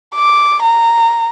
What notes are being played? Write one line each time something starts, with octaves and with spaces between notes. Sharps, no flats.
D6
A#5